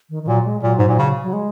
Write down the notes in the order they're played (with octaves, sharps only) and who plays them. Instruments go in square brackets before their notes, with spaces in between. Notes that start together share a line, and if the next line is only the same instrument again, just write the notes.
[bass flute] D#3
D#3
[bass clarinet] A#2 [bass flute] F#3
[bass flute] G#3
[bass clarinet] A#2 [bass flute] F#3
[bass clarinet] G#2
A#2
C#3
[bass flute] F#3
G#3